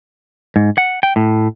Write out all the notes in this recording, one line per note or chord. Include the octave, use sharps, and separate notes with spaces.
G#2
F#5
G5
A2